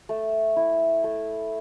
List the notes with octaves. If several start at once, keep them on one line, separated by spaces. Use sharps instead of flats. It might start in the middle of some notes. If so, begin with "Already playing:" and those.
A3
E4
A3